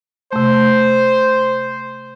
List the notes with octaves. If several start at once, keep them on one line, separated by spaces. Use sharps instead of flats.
C3 A3 C5